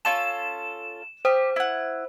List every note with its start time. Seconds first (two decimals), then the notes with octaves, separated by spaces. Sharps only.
0.05 C#4 F4 A4 E7
1.25 G4 C5 D#6
1.56 E4 F#5